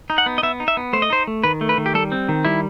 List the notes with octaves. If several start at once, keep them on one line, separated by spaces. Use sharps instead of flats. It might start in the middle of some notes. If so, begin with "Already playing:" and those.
D#4
F#5
B3
D#5
B3 E5
D#4
E5
B3
A3 C5
D#5
D#4 C5
A3
D#3 B4
A3
B4
D#3
G4
G3 A4
C4
D#3
G3 E4